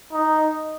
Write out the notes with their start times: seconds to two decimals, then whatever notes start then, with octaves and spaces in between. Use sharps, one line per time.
0.13 D#4